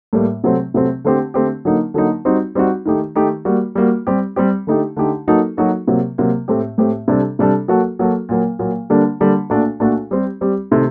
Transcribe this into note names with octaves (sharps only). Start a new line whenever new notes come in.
A2 G3 A#3
C3 F#3 A3 C4
C3 F#3 A3 C4
D3 A3 C4 G4
D3 A3 C4 G4
D3 F#3 A#3 D#4
D3 F#3 A#3 D#4
G3 C4 D#4 F#4
G3 C4 D#4 F#4
D#3 A3 D#4 G4
D#3 A3 D#4 G4
G3 A#3 F#4
G3 A#3 F#4
G3 C4 G4
G3 C4 G4
D3 A3 D#4 G4
D3 A3 D#4 G4
F#3 A#3 D#4 F#4 A4
F#3 A#3 D#4 F#4 A4
C3 F#3 A#3
C3 F#3 A#3
A2 A3 C4 G4
A2 A3 C4 G4
C3 G3 D4 A4
C3 G3 D4 A4
F#3 A#3 F#4 A4
F#3 A#3 F#4 A4
A#2 F#3 A#3
A#2 F#3 A#3
D3 G3 A#3 D4
D3 G3 A#3 D4
A#2 A3 D4 F#4 A4
A#2 A3 D4 F#4 A4
G3 C4 G4
G3 C4 G4
C3 D#3 A3